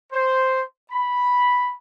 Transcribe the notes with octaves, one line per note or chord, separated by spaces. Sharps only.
C5
B5